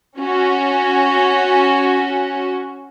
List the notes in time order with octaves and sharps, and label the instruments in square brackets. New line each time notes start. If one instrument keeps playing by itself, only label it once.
[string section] C#4 F#4